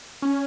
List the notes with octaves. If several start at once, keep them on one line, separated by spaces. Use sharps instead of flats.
C#4